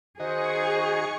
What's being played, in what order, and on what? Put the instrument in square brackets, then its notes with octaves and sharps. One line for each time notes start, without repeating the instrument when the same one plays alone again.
[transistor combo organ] D#3 F#4 D#5 [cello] G#4 [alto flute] C5 [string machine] G#5 C#6 C#7